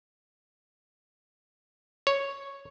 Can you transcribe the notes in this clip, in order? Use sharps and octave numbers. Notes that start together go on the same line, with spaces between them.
C#5